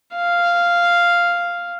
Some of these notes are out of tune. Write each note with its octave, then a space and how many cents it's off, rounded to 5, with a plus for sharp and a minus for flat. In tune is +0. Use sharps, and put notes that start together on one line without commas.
F5 -5